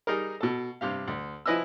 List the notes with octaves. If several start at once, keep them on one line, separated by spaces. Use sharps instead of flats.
G3 D#4 G#4 A#4
B2 A4
G2 C3 G4 F5
D2
F3 E4 B4 D#5 G#5 E6